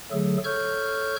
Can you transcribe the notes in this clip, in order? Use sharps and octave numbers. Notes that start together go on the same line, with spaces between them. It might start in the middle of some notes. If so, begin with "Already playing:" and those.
D3 F#3 A3 G#4 A4
A4 C#5 C#6 F6 G6